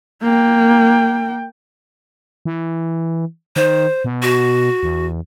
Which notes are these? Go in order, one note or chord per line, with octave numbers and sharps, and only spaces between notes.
A#3 G5
E3
D#3 C5
B2
F#4
E2